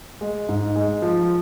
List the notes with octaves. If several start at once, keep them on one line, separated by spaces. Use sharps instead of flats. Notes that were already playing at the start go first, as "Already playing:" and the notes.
G#3
G#2
G#3
F3